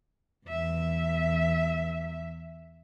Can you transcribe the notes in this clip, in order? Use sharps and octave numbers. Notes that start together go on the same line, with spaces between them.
E2 E5